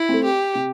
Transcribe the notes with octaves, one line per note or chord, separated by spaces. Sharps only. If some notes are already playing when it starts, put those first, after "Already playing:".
Already playing: E4
A3 C4
G4
C3